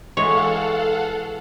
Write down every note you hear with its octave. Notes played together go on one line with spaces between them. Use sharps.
E3 G#3 F#4 A4 C#5 F5 F#5